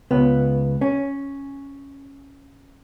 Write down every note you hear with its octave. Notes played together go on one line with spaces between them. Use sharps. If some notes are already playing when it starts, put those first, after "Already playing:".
C#2 B3
C#4